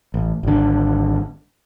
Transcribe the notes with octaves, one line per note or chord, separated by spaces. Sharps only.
A1
G#1 D3